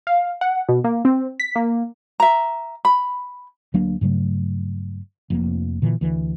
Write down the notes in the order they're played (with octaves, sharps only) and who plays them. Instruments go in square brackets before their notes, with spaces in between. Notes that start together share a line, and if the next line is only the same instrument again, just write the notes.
[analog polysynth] F5
F#5
B2
A#3
C4
B6
A#3
[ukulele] E5 A#5
B5
[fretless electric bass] D2 F#3 A#3 D4
G2 C#3 F#3 A3
F1 F2 A#3
A#2 D3 E3
D2 E3